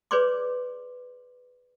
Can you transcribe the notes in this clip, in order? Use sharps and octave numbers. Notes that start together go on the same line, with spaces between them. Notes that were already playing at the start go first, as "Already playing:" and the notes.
G#4 B4 C#5 D5 C6 D6